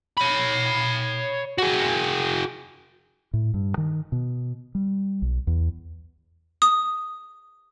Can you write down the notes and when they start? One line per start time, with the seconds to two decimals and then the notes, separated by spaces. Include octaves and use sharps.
0.17 C#5 B5
1.58 F#4 G#4
3.33 A2
3.54 G2
3.78 D#3
4.12 B2
4.75 G3
5.22 B1
5.47 E2
6.62 D#6